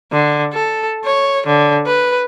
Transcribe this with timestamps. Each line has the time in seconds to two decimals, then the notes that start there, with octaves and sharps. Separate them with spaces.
0.12 D3
0.53 A4
1.05 C#5
1.47 D3
1.86 B4